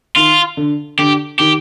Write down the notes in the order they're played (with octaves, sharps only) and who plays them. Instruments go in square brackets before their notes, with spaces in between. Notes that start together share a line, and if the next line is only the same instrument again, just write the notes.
[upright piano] D#3 [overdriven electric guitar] F4
[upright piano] D3
[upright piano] D3 [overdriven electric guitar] G4
[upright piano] D#3 [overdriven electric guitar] G4